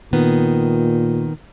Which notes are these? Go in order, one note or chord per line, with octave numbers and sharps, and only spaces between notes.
A#2 D#3 B3